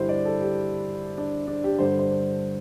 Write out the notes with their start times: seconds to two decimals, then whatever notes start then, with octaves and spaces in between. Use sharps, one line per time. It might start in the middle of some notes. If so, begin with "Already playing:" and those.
Already playing: G2 D3 D4 E4 G4 C5
0.09 D5
0.25 A4
0.41 G4
1.18 D4
1.47 D4
1.64 G4
1.78 G2 D3 C5
1.99 C5